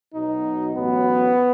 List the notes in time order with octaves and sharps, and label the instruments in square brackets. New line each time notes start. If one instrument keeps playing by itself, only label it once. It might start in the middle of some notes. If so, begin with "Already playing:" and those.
[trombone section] B1 B2 F#3 D#4
A1 A2 F#3 B3